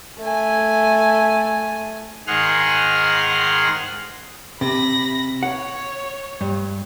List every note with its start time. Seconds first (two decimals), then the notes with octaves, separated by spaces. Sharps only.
0.19 A3 G#5
2.27 G#2 D#3 G#4 F#5 C6 F6
4.61 C3 B5 A#6
5.43 C#5 F#5
6.41 G2